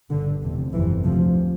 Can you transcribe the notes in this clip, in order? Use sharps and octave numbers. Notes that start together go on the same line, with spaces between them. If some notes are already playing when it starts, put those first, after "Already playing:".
G1 G2 D3
F1 E2 C3
G1 F2 C3 E3
D2 C3 F3